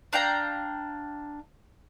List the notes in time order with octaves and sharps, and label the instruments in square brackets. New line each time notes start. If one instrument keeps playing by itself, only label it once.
[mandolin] D4 F5 G5 A#5